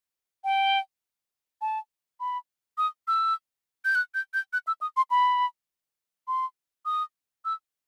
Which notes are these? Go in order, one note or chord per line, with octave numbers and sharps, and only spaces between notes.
G5
A5
B5
D#6
E6
G6
F#6
G6
G6
F#6
E6
D#6
C6
B5
C6
D#6
E6